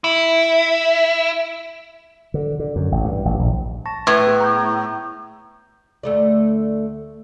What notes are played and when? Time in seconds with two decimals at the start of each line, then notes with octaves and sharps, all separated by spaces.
0.04 E4
2.34 D3
2.59 D3
2.76 F#2
2.92 A1
3.05 G2
3.25 A1
3.39 A#1
3.86 A5 C#6 A#6
4.07 A2 B4 C#6
4.27 B3 G#4
4.40 A#5 C#6 G6
6.03 D2 A3 D5